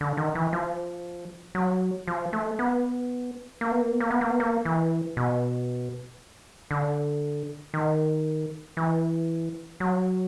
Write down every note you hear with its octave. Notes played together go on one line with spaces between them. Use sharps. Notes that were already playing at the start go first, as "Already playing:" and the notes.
D3
D#3
E3
F3
F#3
F3
A3
B3
A#3
B3
A#3
B3
A#3
B3
A#3
B3
A#3
E3
B2
D3
D#3
E3
F#3